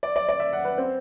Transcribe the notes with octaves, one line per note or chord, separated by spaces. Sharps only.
D5
D5
D5
E5
F#5
B4
C4